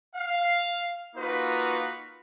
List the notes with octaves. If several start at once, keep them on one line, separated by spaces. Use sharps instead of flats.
F5
A#3 D#4 F4 F#4 B4